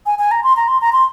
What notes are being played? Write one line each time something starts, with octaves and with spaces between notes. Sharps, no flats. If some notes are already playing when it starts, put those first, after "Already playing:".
G#5
G#5
A#5
C6
A#5
C6
A#5
C6